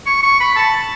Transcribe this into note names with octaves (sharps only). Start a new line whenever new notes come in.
C#6
C#6
B5
A5